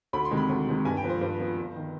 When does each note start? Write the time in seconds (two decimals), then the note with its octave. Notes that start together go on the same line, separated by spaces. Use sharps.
0.13 D2 B5
0.25 C6
0.31 C3 D#3 G#3
0.37 B5
0.49 D2
0.67 C3 D#3 G#3
0.85 G2 G#5
0.97 G5
1.03 F3 B3 B4
1.09 C5
1.21 G2 C5
1.39 F3 B3
1.58 G1
1.76 D#3